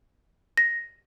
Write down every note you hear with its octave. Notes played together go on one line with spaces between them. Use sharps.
A#6